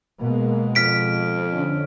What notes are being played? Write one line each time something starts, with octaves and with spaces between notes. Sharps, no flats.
B2 G#3 A#3
F2 F6 B6 D7
D3 C#4